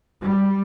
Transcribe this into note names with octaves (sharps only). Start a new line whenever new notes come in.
G3